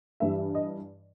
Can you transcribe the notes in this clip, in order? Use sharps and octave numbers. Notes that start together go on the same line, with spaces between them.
G2 E3 G3 E5
D#5